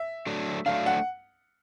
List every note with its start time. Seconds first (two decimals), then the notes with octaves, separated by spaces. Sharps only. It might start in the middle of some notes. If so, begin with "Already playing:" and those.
Already playing: E5
0.27 F#3 A3 D4
0.66 F#3 A3 D4 F5
0.86 F#5